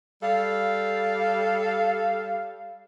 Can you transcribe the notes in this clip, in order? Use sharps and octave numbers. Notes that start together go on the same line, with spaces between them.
G3 A4 F5